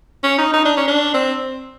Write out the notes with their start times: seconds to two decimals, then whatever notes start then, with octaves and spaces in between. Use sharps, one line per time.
0.23 C#4
0.38 D#4
0.53 D#4
0.65 D4
0.77 C#4
0.88 D4
1.14 C4